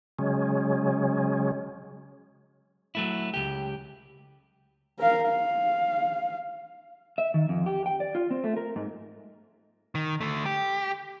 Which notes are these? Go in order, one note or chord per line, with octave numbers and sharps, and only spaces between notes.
C#3 F#3 G#3 C#4
F#3 A3 E4
C#2 G4
A#4 F5
F5
E5
D#3
F2
G4
G5
D5
F4
C4
A3
A#4
G#2
D#3
D3 A3
G4